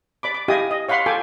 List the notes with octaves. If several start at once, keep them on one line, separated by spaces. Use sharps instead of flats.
D5 B5 D6
D6
E4 G4 D#5 F5 G#5 D#6
D#5
C#5 F5 F#5 B5 C6
F4 A4 G5 G#5 D6